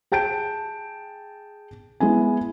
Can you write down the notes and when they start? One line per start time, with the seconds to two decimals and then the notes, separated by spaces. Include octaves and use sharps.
0.12 G#4 G5 A5 G6 D7
2.00 G#3 B3 E4 G#5